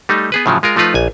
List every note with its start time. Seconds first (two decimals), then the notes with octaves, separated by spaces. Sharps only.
0.09 G3 A3 D#4
0.32 B3 G#4 B4
0.46 A2 C#3 F3 F#3
0.63 G#3 F4 A#4
0.76 F3 A3 D#4 F4 B4
0.94 A#1 G#5